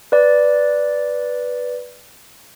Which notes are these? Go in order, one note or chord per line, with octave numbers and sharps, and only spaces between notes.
B4 D5